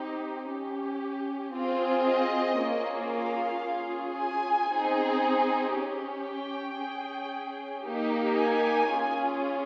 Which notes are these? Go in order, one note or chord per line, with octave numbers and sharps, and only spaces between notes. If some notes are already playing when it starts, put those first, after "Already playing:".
Already playing: C4 D#4 G4
C#4 G4
C4 F4 G#4
D#5
A#3 C#4 F4 G#4
F5
C#4 F4 G#4
G#5
C4 D#4 G#4
C#4 G4
G5
C#4 G#4
A#3 D#4 G4
G#5
C#4 F4 G#4